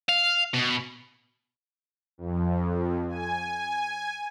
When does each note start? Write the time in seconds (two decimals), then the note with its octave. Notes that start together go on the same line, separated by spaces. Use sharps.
0.09 F5
0.54 B2
2.18 F2
3.09 G#5